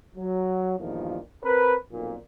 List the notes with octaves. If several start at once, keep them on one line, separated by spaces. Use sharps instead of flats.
F#3
E2 G2 A#2 D#3 F3
C4 A#4 B4
B1 F2 A#2